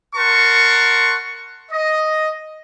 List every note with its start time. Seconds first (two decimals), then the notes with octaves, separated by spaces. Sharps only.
0.15 A#4 F#5 A5 C6 C#6
1.71 D#5